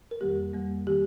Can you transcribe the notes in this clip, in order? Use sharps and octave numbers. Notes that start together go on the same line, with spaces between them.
A#4
F2 D#3 G3 A#3 G4
F2 D#3 G3 A#3
D#3 G3 A#3 G4